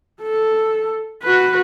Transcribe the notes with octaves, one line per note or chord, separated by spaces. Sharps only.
A4
F#4 B4